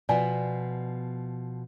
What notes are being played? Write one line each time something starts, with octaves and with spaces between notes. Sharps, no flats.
B2 F3 B3 D5 G#5